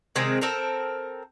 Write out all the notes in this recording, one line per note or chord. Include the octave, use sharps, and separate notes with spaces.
C3 D#3 G#3 C4
C4 A4 A#4